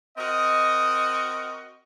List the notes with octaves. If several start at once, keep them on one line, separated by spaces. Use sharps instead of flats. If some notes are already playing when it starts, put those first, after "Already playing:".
C4 F#4 A#4 D#5